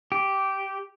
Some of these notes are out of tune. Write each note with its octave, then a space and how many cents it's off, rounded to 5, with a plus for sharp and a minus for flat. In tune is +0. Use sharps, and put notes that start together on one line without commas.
G4 -10